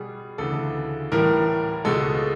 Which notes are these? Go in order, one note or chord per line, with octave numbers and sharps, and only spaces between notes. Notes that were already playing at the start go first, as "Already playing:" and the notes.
Already playing: B2 G3 B3 G#4
D2 C#3 E3 A4
A2 E3 G3 A#4
C#2 B2 G#3 A4